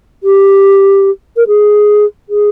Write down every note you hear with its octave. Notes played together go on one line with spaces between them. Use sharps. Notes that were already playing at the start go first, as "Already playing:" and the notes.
G4
A#4
G#4
G#4